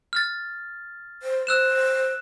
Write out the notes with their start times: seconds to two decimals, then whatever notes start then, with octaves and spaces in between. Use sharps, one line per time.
0.13 F6 A6
1.22 C5
1.47 C5 E6 F#6 E7